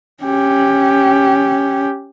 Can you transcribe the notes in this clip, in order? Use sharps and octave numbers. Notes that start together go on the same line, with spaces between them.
C#4 G4